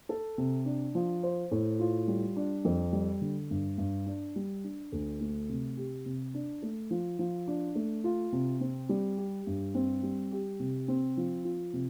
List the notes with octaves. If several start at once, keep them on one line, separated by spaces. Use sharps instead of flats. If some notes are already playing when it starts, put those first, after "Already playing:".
A4
C3
D4
F3
C5
A2
F4
G3
D4
F2
G3
D3
G2
G2
D4
G3
D4
D2
A3
C3
G4
C3
D4
A3
F3
F3
D4
A3
F4
C3
C4
G3
G4
G2
C4
G3
G4
C3
C4
F3
F4
C3